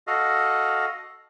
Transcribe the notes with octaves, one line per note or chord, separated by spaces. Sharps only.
F#4 A4 D#5 F5